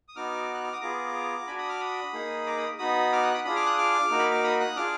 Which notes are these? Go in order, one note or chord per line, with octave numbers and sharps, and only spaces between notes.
D#6
B3 D#4 F#4 D6 F6
F#6
F6
D#6
B3 F4 G#4 A#5 D6
D4 F#4 G#5 B5
B5 D#6
D6 F6
B5 D#6
A#3 D#4 G#4
A#5 D6
B5 D#6
B3 D#4 F#4 B5 D#6
D6 F6
D#6 F#6
B5 D#6
D4 F4 G#4 B5 D#6
D6 F6
D#6 F#6
D6 F6
A#3 D#4 F#4
B5
D6
B5 D#6
D#6 F#6
D4 F4 G#4 D6 F6